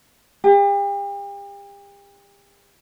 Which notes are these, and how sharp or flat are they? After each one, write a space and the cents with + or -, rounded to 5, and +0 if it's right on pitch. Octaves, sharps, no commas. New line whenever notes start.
G4 +40